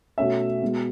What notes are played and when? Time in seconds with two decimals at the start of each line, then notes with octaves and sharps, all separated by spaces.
0.18 B2 A3 C#4 E5
0.62 B2 G#3 B3